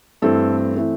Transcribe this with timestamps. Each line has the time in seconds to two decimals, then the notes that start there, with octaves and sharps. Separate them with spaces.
0.22 G2 E3 A3 C4 A4
0.76 E3 A3 C4